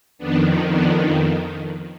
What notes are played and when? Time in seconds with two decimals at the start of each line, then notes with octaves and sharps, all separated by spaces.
0.18 F2 D#3 B3 D4
0.70 B3 D4